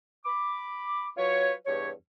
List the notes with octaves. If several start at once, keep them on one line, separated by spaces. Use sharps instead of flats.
B5 D6
F#3 F4 B4 C#5
E2 G2 G4 C#5